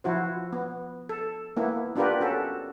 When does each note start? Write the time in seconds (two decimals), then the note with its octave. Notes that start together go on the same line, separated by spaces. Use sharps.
0.04 F3 E4 F#4 C5
0.53 B3
1.09 A4
1.57 A#3 B3 E4
1.96 B3 D4 F4 G4 A#4 B4
2.20 C#4 F#4 A4